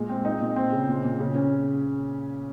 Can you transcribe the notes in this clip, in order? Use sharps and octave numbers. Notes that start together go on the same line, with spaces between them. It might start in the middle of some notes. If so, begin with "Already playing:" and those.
Already playing: A#2 G#3
C4
D#4
A#2
C4
C#3
A#2
A#2
C#3
C#4